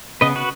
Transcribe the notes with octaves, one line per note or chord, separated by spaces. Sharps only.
C#3 B3 B4 D#5
F#4 B4